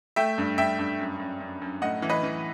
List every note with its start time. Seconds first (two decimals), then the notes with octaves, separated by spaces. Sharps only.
0.16 A3 E5 G5
0.38 G2
0.58 G2 E5 G5
0.79 G2
0.99 F#2
1.20 F#2
1.40 F#2
1.62 F#2
1.82 A2 D#5 F#5
2.02 E3
2.09 B4 D#5
2.23 E3